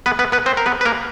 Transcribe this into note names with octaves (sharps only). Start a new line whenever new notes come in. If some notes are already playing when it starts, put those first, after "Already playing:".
B3 B4
B3 B4
B3 B4
C4 C5
A#4
B3 B4
B4
A#3 A#4